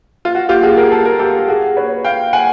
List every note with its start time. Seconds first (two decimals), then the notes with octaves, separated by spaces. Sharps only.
0.25 F4
0.35 F#4
0.49 F4 G4
0.63 F#4 G#4
0.77 G#4 A#4
0.92 A4
1.05 A#4
1.19 G4 A4
1.48 F#4 G#4
1.76 B4 C#5
2.04 F5 G5
2.33 F#5 G#5